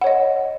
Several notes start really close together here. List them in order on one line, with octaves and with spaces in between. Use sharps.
F#5 C#5 D#5